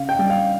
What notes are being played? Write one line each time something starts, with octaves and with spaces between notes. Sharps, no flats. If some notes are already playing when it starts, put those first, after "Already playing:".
Already playing: C#3 F5
G5
G3
F5